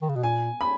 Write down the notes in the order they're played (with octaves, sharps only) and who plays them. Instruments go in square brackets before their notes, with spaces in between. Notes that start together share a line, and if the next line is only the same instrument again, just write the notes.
[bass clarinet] D#3
C#3
B2
[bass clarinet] A#2 [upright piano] G#5
[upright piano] B5